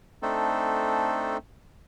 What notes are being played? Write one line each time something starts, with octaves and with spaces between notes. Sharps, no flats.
A3 C4 D4 D#4 A4